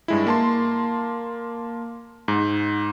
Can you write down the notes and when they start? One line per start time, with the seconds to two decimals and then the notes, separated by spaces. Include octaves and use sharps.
0.08 G2 G#3 E4
0.27 A#3 A5 C6
2.28 G#2